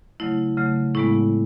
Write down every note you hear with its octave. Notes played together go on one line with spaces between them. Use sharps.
C#3 F#3 A3 E4
C#3 F#3 A3
A2 G#3 B3 E4